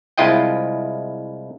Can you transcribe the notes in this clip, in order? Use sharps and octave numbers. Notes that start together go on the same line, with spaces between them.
C2 G#3 E4 F4 D#5 G5